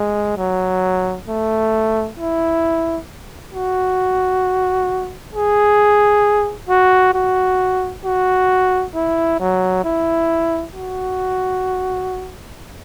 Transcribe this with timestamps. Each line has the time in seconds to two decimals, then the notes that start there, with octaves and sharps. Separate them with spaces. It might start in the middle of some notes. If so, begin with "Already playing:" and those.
Already playing: G#3
0.37 F#3
1.28 A3
2.18 E4
3.53 F#4
5.34 G#4
6.69 F#4
7.14 F#4
8.05 F#4
8.94 E4
9.39 F#3
9.84 E4
10.74 F#4